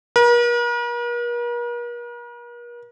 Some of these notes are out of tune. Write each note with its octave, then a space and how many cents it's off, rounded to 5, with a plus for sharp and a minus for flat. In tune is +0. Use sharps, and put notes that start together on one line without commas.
A#4 +45